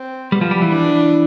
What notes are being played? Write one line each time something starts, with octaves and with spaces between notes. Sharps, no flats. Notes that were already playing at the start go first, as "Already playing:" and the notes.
Already playing: C4
G3 B3
F3
G3
E3
D4